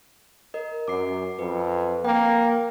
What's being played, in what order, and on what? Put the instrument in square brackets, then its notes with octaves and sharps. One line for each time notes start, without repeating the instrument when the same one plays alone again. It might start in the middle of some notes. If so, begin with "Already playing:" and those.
[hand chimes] A#4 D#5
[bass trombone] F#2 [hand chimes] D6 C7
[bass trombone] F2 [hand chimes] B4
[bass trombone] A#3 [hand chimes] G5